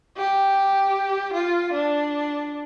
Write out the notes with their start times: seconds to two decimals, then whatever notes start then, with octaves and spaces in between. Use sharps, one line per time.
0.17 G4
1.34 F4
1.74 D4